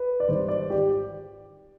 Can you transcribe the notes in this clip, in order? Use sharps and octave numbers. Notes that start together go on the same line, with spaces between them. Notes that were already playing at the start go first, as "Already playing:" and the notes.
Already playing: B4
D5
G#1 G#2 D#3 G3 C5
D5
G4